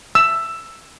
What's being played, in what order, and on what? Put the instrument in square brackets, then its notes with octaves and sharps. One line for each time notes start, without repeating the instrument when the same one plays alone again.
[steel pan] E6